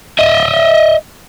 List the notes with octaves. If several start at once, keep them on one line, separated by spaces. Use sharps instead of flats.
D#5 E5